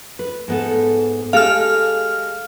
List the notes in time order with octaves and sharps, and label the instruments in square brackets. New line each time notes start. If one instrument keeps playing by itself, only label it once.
[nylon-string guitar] B4
G#2 B3 A4
[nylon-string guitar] G#3 G4 A4 [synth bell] F5 F6